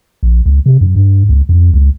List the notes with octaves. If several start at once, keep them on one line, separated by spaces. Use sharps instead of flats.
A#1
C#2
C3
F#2
G2
C#2
F2
C#2